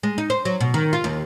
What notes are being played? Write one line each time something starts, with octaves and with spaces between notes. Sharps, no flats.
G#3
D#4
C5
F#3
B2
D#3
F4
D#2